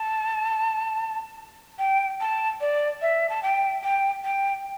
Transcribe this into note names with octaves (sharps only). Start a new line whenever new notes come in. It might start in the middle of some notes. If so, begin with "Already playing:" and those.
Already playing: A5
G5
A5
D5
E5
A5
G5
G5
G5